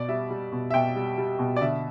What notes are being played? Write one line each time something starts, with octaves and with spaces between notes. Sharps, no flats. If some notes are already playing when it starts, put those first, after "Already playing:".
Already playing: B2 D5
G3 E5
G3
B2
E5
B2 G5
G3
G3
B2
D5
D3 E5